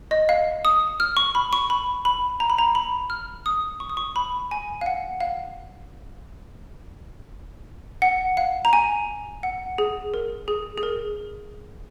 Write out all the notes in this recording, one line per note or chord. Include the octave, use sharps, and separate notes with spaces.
D#5
F5
D#6
F6
C#6
B5
C#6
B5
B5
A#5
B5
A#5
B5
F6
D#6
C#6
D#6
C#6
B5
G#5
F5
F#5
F5
F#5
F5
A#5
G#5
F#5
G#4
A#4
G#4
G#4
A#4